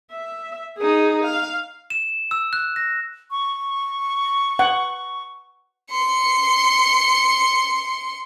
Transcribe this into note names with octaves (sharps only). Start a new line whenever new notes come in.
E5
D#4 G#4
F5
E7
E6
F#6
A#6
C#6
F#5
C6 C#7